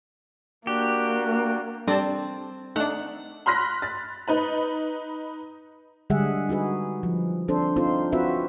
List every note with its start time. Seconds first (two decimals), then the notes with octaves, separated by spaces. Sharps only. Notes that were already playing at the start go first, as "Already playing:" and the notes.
0.67 A#3 D4 F#4 G4
1.88 G3 C4 D4 A4 D5 A5
2.76 A3 D4 D#4 F#5
3.46 B5 C6 F6 F#6 A#6 B6
3.82 A6
4.28 D#4 B4 B5
6.10 D3 G3 G#3 G#4 E5 F#5
6.49 D#4 F#4 G#4 B4
7.03 F3
7.48 C4 D4 A4 C5
7.76 C4 D#4 F4 A4 C5
8.12 C4 F4 F#4 B4 E5